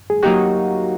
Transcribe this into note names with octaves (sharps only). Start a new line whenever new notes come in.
G#4
F#3 A#3 D#4 F#4 G4